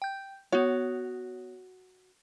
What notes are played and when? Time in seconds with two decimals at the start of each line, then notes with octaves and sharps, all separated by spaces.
0.02 G5 G6
0.52 B3 F#4 C#5